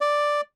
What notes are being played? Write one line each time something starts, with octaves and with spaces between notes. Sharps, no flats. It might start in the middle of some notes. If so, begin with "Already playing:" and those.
D5